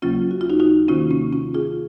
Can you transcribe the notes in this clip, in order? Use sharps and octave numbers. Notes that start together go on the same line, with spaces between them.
D#2 C#3 F#3 A#3 C#4 F4
F#4
F4
D#4 F#4
D#4 F#4
C3 D#3 A#3 C#4 F4
A#3 C#4
C#4 F4
F4 G#4